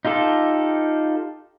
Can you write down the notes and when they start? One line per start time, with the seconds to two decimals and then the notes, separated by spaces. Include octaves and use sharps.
0.05 D#4 F4 G4 A4